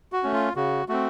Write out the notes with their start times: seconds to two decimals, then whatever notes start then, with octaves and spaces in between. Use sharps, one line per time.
0.12 F#4
0.23 A3 C#4
0.34 F4
0.56 C#3 F#4
0.88 A3 C4 F#4